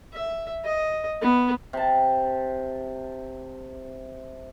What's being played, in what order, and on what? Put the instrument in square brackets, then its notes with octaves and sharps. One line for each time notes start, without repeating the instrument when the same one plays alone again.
[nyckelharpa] E5
D#5
B3
[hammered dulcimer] C3 A5